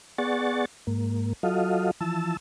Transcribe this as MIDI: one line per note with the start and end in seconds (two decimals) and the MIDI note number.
0.18 0.65 59
0.18 0.65 68
0.18 0.65 74
0.18 0.65 78
0.18 0.65 85
0.18 0.65 93
0.87 1.33 44
0.87 1.33 58
1.43 1.91 54
1.43 1.91 65
1.43 1.91 66
1.43 1.91 69
1.43 1.91 75
1.43 1.91 77
2.01 2.37 52
2.01 2.37 53
2.01 2.37 81
2.01 2.37 88